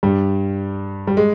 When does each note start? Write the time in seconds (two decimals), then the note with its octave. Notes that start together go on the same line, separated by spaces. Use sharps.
0.03 G2 G3
1.07 G3
1.17 G#3